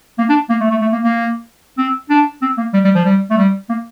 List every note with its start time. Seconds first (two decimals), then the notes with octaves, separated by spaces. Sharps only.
0.19 A#3
0.29 D4
0.50 A#3
0.61 A3
0.71 A3
0.82 A3
0.93 A#3
1.04 A#3
1.78 C4
2.10 D4
2.42 C4
2.58 A#3
2.74 G3
2.85 G3
2.95 F3
3.05 G3
3.30 A3
3.37 G3
3.69 A#3